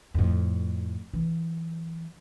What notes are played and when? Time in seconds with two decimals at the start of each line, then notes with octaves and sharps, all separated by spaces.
0.14 F2 A2
1.13 E3 F#3